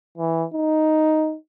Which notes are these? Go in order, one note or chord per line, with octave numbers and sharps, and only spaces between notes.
E3
D#4